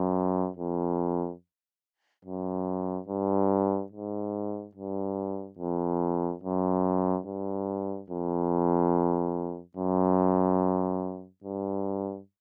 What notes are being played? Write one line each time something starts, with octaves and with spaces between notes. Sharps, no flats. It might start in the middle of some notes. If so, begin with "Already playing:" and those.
Already playing: F#2
F2
F#2
G2
G#2
G2
F2
F#2
G2
F2
F#2
G2